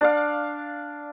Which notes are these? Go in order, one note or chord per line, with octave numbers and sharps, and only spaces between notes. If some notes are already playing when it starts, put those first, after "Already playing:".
D4 D5 F5